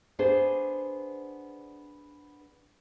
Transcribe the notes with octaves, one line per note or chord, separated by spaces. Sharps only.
B3 D4 G#4 C5